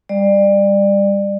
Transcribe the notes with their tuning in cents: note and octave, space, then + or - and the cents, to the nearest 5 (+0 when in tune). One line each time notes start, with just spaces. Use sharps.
G3 +25 D5 +25